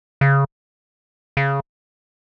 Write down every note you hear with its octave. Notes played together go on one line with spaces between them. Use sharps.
C#3
C#3